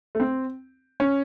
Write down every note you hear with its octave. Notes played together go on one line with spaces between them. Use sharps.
A3
C4
C#4